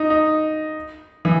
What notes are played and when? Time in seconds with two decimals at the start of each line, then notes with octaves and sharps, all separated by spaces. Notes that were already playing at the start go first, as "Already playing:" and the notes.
Already playing: D#4
0.10 D#4
1.25 E3